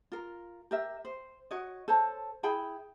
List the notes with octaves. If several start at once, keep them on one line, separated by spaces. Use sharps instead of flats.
F4 A#4
G4 A#4 E5
C5
F#4 C#5 D#5
A4 C5 C#5 A5
E4 G#4 G5 B5